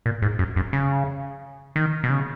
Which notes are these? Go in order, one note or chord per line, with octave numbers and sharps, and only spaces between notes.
A#2
G#2
F#2
F#2
C#3
D#3
B2
C#3